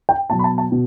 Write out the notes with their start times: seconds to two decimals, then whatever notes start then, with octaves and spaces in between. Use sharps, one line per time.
0.09 G5
0.30 B2 F#3 B3 A5
0.39 B5
0.44 A5
0.58 A5
0.71 B2